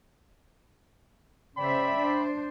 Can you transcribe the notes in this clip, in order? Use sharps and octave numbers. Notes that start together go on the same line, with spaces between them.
C#3 C5 D5 E5 G5 B5
D4 C5